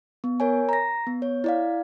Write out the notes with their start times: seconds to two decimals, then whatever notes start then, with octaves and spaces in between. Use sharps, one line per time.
0.24 B3
0.40 A#4 C#5 G#5
0.69 A#5 A#6
1.07 B3
1.22 C#5
1.44 E4 D5 F5